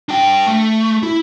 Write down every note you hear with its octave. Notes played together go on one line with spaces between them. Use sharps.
D4 G5
A3
E4